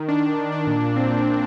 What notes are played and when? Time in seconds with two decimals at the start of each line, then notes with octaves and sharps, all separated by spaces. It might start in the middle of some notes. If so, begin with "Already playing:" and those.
Already playing: D#3
0.09 D4
0.23 D4
0.38 D#3
0.52 D4
0.67 A#2
0.82 A#2
0.96 C4
1.11 A#2